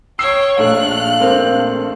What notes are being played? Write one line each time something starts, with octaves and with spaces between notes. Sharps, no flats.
C#5 G5 E6 C7 E7
A#1 A3 F5 F#6
A#3 C4